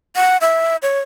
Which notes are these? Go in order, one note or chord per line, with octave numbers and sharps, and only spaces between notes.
F#5
E5
C#5